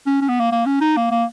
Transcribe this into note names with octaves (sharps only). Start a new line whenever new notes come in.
C#4
C#4
B3
A#3
A#3
C#4
D#4
A#3
A#3